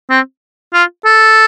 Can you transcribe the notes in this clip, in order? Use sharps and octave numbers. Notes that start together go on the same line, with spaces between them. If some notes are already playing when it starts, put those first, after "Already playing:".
C4
F4
A4